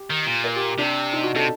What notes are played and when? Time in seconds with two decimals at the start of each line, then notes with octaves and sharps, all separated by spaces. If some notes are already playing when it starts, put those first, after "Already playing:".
Already playing: G4
0.10 D#3
0.26 A#2
0.44 A#4
0.56 G4
0.78 C3 D4
1.13 D#4
1.23 F#4
1.35 C3 A4